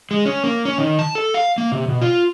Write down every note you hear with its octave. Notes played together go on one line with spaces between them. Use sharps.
G#3
C#4
A#3
C#4
D#3
A5
A4
F5
A#3
C3
B2
F4